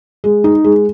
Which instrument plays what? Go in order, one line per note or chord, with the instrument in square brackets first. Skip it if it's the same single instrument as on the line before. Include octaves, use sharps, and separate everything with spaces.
[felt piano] G#3
D#4
G#3